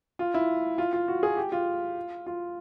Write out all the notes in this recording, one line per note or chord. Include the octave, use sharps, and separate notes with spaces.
F4
E4
F4
F4
F#4
G#4
G4
F4
F4